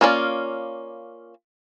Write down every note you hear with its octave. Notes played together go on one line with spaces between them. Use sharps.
A#3 C#4 F4 A4 D5